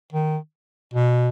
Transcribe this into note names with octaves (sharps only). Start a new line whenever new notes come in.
D#3
B2